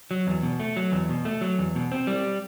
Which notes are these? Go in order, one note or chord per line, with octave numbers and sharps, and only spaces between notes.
F#3
E2
B2
A3
F#3
E2
B2
A3
F#3
E2
B2
C4
G3